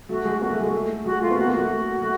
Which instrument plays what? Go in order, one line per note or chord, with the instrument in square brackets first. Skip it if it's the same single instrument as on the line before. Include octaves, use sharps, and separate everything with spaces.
[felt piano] A3 [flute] F#4
[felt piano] G#3
[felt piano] A#3 [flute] F#4
[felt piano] A3
G#3
A3
[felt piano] G#3 [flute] F#4
[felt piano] A3 [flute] F4
[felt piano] B3
[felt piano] A#3 [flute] F#4
[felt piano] A#3
[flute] F#4
[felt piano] A3
A3